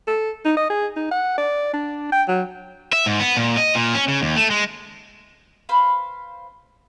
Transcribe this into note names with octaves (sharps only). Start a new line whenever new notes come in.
A4
D#4
D#5
G#4
D#4
F#5
D5
D4
G5
F#3
E5
G#2
B3
A#2
D#5
A#2
C#4
C#3
D#2
A3
G#3
B4 C5 F5 B5